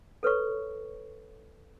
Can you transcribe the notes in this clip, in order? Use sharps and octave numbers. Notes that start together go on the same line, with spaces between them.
A4 B4 C#5 C#6